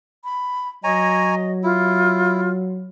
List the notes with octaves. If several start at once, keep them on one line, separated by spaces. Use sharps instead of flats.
B5
F#3 C#5 D#5 G#5 A#5
E4 F4